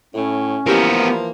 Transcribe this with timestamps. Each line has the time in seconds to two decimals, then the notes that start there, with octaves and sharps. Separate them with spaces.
0.15 A2 C#4
0.66 E3 F3 A#3 B3 E4 G4 A#4 D5